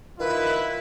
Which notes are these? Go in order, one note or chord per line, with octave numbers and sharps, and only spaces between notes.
D#3 E4 F4 B4